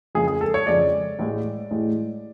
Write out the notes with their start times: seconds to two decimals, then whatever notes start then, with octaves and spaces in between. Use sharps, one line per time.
0.15 F2 C#3 G#3 G#4
0.28 G#4
0.41 A4
0.54 C#5
0.66 F2 C#3 G#3 D5
1.19 A1 A2 G#3
1.71 A1 A2 G#3